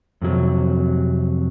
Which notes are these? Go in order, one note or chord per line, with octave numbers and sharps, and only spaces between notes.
F2 C3 F#3